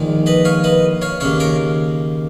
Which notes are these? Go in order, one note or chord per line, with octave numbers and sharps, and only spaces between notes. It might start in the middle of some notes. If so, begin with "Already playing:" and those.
Already playing: A#1 G#2 D#3
B4 D#5
C#5 F5
B4 D#5
C#5 F5
D#2 C#3 C#5 F5
A#4 C#5